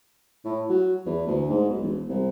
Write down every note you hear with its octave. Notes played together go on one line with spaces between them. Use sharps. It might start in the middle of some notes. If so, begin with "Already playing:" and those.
A2
F#3
E2
D2
G#2
B1
E1
C2